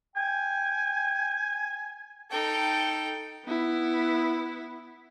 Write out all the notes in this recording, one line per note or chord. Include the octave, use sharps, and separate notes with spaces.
G5 G#5
D#4 A4 G5
B3 E4